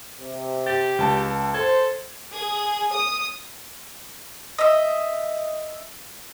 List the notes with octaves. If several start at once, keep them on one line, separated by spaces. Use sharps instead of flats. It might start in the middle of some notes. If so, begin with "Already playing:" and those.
C3
G4 A6
C#2 A5
A4 C5 G#6
G#4
D#6
D#5 E5